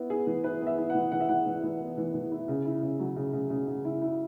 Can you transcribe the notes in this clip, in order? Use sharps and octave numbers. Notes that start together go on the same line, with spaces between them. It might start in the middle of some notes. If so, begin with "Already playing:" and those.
Already playing: B3 E4
B3 G#4
E3
E4 B4
B3
E5
E4
F#5
E3
E3 F#5
E5
E3 F#5
E3
E3
B3
E3
E3
E4
C#3
E4
C#3
F#3
C#3
C#3
C#3
C#3
E4
E4